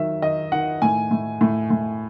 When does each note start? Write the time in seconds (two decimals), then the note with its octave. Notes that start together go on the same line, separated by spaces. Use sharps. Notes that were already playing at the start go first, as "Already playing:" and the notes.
Already playing: D#3 F#3 E5
0.22 D#3 D#5
0.52 D#3 F#5
0.82 A2 G#5
1.11 A2
1.41 A2
1.70 A2